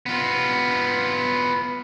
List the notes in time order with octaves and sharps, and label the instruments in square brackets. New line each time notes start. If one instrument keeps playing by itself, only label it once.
[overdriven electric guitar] B3 F4